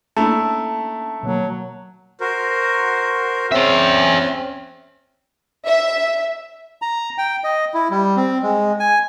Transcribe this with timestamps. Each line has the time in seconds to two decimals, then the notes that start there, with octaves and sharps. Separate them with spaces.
0.17 A3 A#3 C#4 D4 E4 A5 A#5
1.23 B2 D#3 F#3 A#3
2.20 F#4 A#4 C5
3.52 C4 C#4 G#4 E5
5.66 E5
6.82 A#5
7.18 G5
7.44 D#5
7.74 E4
7.91 G3
8.17 C4
8.43 G#3
8.80 G#5